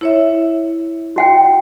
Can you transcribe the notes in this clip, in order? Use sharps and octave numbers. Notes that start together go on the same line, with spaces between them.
E4 C#5 E5
F#4 F#5 G5